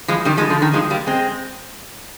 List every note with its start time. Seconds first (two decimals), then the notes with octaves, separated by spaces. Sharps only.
0.08 F3 G#3
0.25 D#3 G3
0.37 F3 G#3
0.50 D3 F3
0.62 D#3
0.73 F3 G#3
0.90 G3 A#3
1.07 G#3 C4